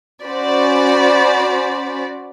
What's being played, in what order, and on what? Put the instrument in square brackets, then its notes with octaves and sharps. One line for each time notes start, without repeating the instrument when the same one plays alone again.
[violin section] C#4 F#4 C5 D5 B5